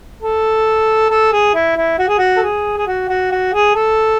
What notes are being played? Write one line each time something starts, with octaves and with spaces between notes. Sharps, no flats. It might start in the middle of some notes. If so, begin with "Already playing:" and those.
A4
A4
G#4
E4
E4
F#4
G#4
F#4
A4
G#4
G#4
F#4
F#4
F#4
G#4
A4